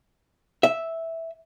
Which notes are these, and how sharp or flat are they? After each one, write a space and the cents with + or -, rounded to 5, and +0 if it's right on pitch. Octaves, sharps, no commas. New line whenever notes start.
E5 -5